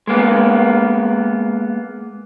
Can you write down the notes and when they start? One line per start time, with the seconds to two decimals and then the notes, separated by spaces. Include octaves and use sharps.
0.07 G#3 A#3 B3